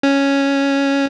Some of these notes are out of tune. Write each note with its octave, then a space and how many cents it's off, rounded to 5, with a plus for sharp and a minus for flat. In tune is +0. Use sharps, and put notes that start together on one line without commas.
C#4 +0